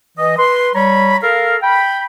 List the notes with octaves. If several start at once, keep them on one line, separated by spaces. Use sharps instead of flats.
E3 D#5
B4 C6
G3 C#5 A#5 B5
A4 A#4 F5
G5 B5